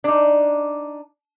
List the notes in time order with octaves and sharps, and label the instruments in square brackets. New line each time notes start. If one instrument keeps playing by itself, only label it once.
[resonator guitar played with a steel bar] D4 D#4